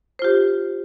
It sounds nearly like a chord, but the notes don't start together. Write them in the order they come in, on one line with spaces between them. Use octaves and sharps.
C5 F4 G4